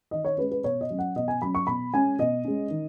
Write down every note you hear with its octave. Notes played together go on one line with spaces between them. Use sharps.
D#3 D#5
C#5
G#3 C#4 B4
B4
B2 C#5
D#5
F#3 C#4
F#5
B2 D#5
G#5
F#3 C#4 B5
C#6
B2 B5
G#3 C#4 G#5
B2 D#5
G#3 C#4
D#3